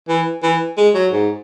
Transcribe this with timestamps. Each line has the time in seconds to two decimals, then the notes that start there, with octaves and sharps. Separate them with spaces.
0.09 E3
0.43 E3
0.77 G#3
0.95 F#3
1.12 G#2